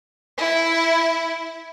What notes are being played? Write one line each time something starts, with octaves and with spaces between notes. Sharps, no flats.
E4